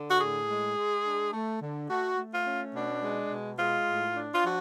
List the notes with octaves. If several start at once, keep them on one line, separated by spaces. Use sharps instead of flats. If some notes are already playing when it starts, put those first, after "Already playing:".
Already playing: D3
F#4
A2 G#4
G#3
G#3
D4
A3
D3
A3 F#4
A3
F4
C#4
B2 D4
G#3
B2
G#3 F4
A2
D4
F4
F3 F#4